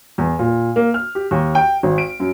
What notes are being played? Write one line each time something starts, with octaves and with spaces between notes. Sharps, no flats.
E2
A#2
A#3
F6
G4
D#2
G5
G#1
D7
F#2